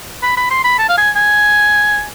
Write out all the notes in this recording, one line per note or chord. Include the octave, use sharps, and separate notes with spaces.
B5
B5
C6
B5
A5
F5
G#5
G#5